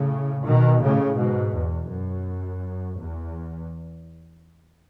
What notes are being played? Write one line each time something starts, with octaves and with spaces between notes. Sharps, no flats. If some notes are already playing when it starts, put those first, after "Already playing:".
Already playing: A2 C#3
B2 D#3
A2 C#3
G#2 B2
E2
F#2
E2